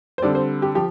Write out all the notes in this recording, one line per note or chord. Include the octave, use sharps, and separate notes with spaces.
C5
D3 G3 C4 D5
C5
G4
F3 G4